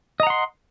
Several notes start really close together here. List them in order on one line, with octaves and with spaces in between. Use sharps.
D#5 A#5 F#5 C6